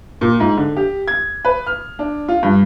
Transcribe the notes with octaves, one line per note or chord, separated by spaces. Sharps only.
A#2
G#2
D3
G4
G#6
B4
F6
D4
F4
G2